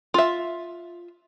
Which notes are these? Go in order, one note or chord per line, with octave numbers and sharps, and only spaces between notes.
F4 E5